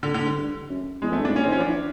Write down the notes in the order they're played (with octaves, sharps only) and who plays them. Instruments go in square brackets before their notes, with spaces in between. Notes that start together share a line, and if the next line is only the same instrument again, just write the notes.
[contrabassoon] A#2 [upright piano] D3
[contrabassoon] A2 [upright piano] D3
[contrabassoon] G#2
G2
F#2
[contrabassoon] E2 [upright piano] G#3
[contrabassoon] F2 [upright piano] A3
[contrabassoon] G2
[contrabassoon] G#2 [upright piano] D4
[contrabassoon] A#2 [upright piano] C#4
[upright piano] C4
[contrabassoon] D#3
[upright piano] C#4
[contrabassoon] F3
[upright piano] D4
[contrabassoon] E3